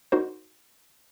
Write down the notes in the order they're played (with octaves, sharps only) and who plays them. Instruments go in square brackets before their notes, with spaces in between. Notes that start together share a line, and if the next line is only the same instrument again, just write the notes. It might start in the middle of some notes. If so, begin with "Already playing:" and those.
[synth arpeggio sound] D#4 F#4 A#4 C5